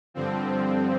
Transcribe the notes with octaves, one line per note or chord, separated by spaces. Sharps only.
G2 D3 F3 C4